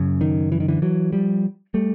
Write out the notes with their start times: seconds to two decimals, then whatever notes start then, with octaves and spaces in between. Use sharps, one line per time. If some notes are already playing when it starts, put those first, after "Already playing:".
Already playing: F#2 C#3
0.21 D#3
0.52 E3
0.60 D#3
0.68 D3 E3
0.82 E3 F#3
1.12 F3 G3
1.74 G3 A3